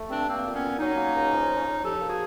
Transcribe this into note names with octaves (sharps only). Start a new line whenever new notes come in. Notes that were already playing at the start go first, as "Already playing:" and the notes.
Already playing: A3
G2 C4 D4
A#3 C4
A#2
B3 C#4
A#2
F#3 C#4 D#4
A#3
C#2
F3
F2
F2
F3 G4 A4
A#3
F#4 G#4